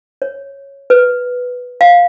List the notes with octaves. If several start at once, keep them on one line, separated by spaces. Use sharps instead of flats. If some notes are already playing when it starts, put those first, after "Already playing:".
C#5
B4
F5